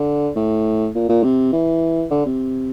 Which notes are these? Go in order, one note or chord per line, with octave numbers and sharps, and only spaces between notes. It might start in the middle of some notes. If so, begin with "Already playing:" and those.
Already playing: D3
A2
A#2
A#2
C3
E3
D3
C3